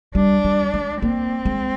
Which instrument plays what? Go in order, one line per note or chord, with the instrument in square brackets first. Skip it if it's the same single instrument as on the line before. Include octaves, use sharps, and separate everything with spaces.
[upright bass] G3 [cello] D4
[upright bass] G3
G#3
[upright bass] A#3 [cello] C4
[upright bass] G#3